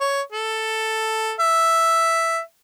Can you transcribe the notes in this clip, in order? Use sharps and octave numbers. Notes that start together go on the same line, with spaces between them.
C#5
A4
E5